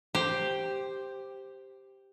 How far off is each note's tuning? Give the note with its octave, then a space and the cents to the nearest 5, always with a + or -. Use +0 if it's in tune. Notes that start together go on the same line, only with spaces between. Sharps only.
G4 +0 C5 +0